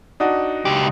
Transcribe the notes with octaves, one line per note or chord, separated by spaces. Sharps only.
D4 D#4 F#4
C#2 G4